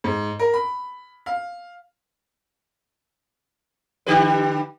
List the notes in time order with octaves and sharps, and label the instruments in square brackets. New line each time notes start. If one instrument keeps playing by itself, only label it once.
[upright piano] G#2
A#4
B5
F5
[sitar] D3 G4 B4